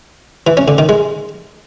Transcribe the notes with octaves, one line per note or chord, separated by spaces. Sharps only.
E3
C#4
D3
D#3
G#3